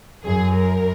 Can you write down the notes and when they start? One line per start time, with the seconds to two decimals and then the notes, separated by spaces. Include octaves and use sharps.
0.25 F#2 G#4
0.55 A#4